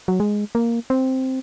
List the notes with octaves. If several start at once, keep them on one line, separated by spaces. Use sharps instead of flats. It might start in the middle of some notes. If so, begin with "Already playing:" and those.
F#3
G#3
A#3
C4